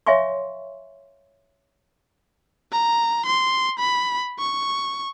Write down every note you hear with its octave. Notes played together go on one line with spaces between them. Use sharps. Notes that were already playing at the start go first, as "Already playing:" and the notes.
C#5 E5 F5 G#5 C6 C#6
A#5
C6
B5
C#6